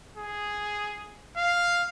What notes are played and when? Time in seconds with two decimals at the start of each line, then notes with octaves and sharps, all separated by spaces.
0.17 G#4
1.37 F5